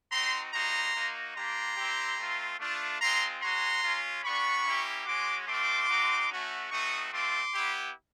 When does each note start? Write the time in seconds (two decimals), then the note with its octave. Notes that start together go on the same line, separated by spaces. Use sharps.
0.12 C4 D#4 F#4 A#5 C6
0.53 G3 A#3 D#4 F#4 A#5 C6
0.95 A#3 D#4 F#4
1.36 G3 A#3 D4 G4 A#5 C6
1.76 C4 E4 G4
2.18 A3 C4 F4
2.59 A3 D4 F4
3.00 G#3 C4 F4 A#5 C6
3.41 G#3 C#4 F#4 A#5 C6
3.83 G#3 C#4 F4
4.24 G3 B3 D4 B5 C#6
4.65 A#3 C#4 E4 G4
5.06 G#3 C#4 F#4 C6 D6
5.48 A3 C4 F4 C6 D6
5.89 G#3 C4 D#4 F#4
6.30 A3 C#4 F#4
6.71 A3 C4 D#4 F#4 C#6 D#6
7.13 A3 C4 F4 C6 D6
7.54 B3 E4 G4